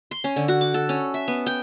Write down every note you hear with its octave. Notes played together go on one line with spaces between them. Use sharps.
C6
C#4
D3
F#4
D6
A4
C#4
E5
B3
G5